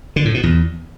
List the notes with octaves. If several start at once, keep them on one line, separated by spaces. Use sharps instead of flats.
D3
A2
B2
E2